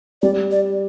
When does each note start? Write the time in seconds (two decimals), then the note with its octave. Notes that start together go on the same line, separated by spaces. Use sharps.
0.22 G3 D5
0.51 D5